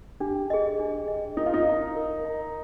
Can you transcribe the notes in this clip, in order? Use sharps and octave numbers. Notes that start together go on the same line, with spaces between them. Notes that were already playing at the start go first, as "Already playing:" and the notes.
D4 G4
G#4 D#5
D4
G#4 D#5
D#4 A#4
F4
D#4
D#5 A#5
A#4
D#5 A#5